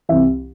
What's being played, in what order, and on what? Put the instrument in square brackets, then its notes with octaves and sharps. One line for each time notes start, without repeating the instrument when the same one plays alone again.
[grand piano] C2 C3 E3 E5